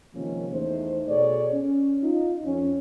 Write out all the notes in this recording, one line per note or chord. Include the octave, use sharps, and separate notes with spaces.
C3 D#3 F3 G#3 A#3 C#4
E2 A3 D#4 C5
B2 G#4 A4 C#5 D5
C#4
D#4 F4
F2 C#4